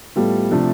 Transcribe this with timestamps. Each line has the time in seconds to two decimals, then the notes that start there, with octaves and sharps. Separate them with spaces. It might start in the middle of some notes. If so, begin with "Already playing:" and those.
0.16 A2 G3 B3 F4 A4
0.51 C3 F3 A3 D4 A4